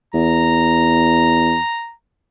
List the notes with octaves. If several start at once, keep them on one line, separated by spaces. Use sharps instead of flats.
E2 A#5